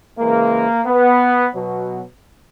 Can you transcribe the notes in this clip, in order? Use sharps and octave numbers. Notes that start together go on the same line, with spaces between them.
C#3 E3 G#3 A#3
B3
B2 F#3